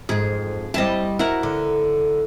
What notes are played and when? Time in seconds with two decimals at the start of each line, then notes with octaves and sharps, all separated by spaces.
0.09 F2 G#2 G#4
0.74 G3 C4 E4 D#5 A5
1.19 E4 F#4 A#4 F#5
1.43 D3